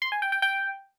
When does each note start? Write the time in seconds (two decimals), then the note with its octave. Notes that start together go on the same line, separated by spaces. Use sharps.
0.02 C6
0.12 G#5
0.22 G5
0.32 G5
0.42 G5